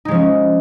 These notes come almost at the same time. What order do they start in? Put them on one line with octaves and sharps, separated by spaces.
D#4 G#3 F3 C#4